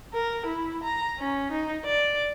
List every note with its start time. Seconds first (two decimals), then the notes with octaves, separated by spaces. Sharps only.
0.14 A#4
0.46 E4
0.83 A#5
1.18 C#4
1.51 D#4
1.85 D5